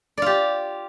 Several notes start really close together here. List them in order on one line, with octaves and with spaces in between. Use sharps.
D5 F4 G4